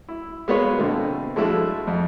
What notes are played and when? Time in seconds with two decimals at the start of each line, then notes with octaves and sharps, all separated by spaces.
0.09 E4
0.48 G#3 A#3 B3 F4 B4 C#5
0.78 B2 D3 A3 A#3 C4
1.36 F3 G#3 A3 D4 E4 F#4
1.87 F2